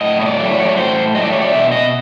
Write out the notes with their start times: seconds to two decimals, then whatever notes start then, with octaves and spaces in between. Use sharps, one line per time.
0.01 A2 D#5
0.21 C#5
0.26 D5
0.39 F#3 A3
0.51 C#5
0.63 D5
0.69 C#5
0.76 A2 C5
1.14 F#3 A3 D#5
1.24 D5
1.33 C#5
1.42 D5
1.52 B2 E5
1.71 D#5